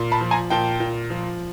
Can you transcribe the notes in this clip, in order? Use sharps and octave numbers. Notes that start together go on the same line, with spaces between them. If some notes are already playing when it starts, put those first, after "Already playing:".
Already playing: A#2
A5 B5
F3
G#5 A#5
A#2 G5 A5
A#2
F3